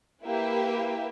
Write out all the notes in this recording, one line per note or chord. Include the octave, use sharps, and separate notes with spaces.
A#3 E4 G4 B4 E5 G5